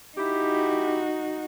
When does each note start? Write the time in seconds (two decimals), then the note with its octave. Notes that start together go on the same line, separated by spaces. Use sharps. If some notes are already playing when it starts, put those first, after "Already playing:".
0.18 D#4 E4 F#4 G4